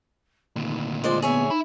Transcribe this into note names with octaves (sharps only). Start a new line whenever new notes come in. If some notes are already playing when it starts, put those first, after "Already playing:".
D2 A#2 D#3
G#3 F4 C5 D5
B3 G#4 C#5 E5
D#4 E5 B5